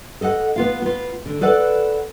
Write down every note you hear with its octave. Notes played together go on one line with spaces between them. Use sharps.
A4 D#5 E5 F#5
B3 F4 F5
B3 F4
D3
A4 B4 D5 F#5